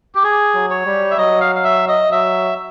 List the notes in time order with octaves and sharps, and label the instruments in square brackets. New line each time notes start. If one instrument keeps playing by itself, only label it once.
[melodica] G4
G#4
[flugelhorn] F#3
[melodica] C#5
[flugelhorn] G3
[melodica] E5
[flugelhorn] F#3 [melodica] D#5
[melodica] F5
F5
E5
D#5
[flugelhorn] F#3 [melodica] E5